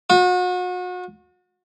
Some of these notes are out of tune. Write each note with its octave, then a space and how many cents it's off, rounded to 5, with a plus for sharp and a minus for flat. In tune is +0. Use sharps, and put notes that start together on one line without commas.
F#4 -40